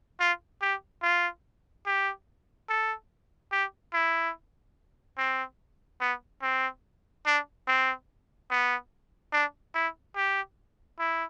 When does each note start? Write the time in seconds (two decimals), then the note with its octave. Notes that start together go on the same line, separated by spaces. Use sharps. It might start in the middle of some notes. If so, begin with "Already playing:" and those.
0.20 F4
0.62 G4
1.03 F4
1.86 G4
2.69 A4
3.52 G4
3.94 E4
5.18 C4
6.01 B3
6.42 C4
7.26 D4
7.67 C4
8.50 B3
9.32 D4
9.75 E4
10.16 G4
10.99 E4